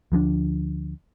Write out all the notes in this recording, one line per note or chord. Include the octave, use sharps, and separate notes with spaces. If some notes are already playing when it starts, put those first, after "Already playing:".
D2 F3 G#3 D4